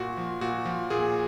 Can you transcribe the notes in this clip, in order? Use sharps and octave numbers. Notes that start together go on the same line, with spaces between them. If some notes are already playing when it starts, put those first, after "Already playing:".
Already playing: A#2 F#4
F3
A#2 F#4
F3
A#2 G#4